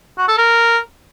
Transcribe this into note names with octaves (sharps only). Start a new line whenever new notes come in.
F#4
A4
A#4